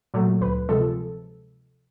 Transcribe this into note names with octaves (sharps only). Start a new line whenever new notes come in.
A#2 F#3 A3
D2 B4
C3 F3 G#3 A4